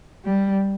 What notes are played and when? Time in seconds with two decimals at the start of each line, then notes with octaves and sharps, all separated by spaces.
0.25 G3